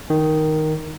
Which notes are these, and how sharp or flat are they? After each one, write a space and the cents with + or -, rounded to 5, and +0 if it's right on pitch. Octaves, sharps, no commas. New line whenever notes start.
D#3 +0